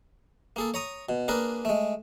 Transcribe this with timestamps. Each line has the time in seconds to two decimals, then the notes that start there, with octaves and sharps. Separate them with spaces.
0.56 A#3 G#4 A4
0.74 C#5 A#5 D#6
1.09 B2
1.28 A#3 D4 G#4 A#4 B4
1.65 G#3 A3